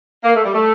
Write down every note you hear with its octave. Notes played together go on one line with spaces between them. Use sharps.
A#3
A3
G3
A3